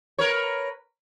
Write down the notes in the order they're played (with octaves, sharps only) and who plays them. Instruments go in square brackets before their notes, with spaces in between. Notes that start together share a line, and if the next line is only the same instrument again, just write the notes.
[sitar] A#4 B4 C#5